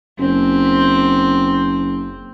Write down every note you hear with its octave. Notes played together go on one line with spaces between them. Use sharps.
F#1 C4